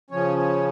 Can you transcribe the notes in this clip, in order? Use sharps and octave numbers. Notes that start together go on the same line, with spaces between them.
C#3 F3 C#4 C#5
C#5